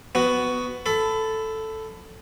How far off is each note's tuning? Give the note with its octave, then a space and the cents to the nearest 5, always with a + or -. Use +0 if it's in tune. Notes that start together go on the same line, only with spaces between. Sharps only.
B3 +10 F#4 +5
A4 +0 B5 +25